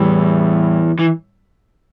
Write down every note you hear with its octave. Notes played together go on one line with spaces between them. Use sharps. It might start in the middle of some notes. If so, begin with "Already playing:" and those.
Already playing: E2 A2 G3 E4
E3